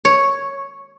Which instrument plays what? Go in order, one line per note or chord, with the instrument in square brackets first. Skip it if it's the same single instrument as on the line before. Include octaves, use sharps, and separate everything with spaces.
[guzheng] C#5